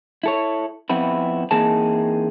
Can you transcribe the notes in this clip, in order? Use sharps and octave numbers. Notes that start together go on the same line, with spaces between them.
E4 A4 C#5
F2 B3 C4 E4
E3 A#3 C4 D#4 G#4 A5